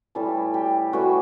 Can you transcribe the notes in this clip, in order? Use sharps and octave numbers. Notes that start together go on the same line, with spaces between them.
A2 E3 G3 A4
G4
A2 E3 G3 F#4